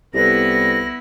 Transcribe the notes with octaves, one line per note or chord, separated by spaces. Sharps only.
C2 B3 E4 G4 A4 B4 A#6